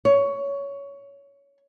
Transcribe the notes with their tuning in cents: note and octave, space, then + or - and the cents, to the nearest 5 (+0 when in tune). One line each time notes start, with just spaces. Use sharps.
C#5 +15